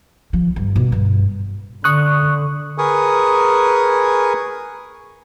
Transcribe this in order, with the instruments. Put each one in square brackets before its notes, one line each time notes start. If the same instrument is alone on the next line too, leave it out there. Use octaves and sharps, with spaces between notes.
[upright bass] F3
G2
B2
G2
[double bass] D3 [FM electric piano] C#6 D#6 F#6
[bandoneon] G#4 A#4 B4 G#5 C#6 D#6